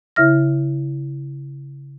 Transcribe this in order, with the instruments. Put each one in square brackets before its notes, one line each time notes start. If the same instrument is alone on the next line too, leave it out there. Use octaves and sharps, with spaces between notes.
[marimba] C#3 E4 E5 F6 A#6